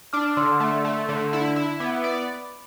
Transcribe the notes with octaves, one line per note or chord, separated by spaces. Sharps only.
D4 D6 F6
D6
D3 C6 E6
A3
A3
D3
E4
E4
B3 B5 D6
D5